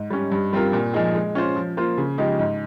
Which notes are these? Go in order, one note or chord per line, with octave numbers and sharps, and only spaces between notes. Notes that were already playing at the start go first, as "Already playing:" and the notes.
Already playing: G#2
G3 C#4
G2
G3 C4 F4 A#4
A#2
F3 G#3 D#4 G#4
G#3
C#4 F4 C5
F3
A#3 F4 C5
C#3
F3 G#3 D#4 G4
G#2